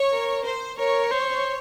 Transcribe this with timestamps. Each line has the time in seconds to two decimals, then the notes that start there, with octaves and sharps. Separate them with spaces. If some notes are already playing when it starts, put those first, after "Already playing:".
Already playing: C#5
0.12 A#4
0.45 C5
0.78 A#4 C#5
1.11 C5